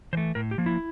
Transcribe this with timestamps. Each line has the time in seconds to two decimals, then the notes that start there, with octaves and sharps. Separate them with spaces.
0.13 E3 C5
0.17 A3
0.35 A2 A#4
0.51 G4
0.58 F3 A#3
0.66 E4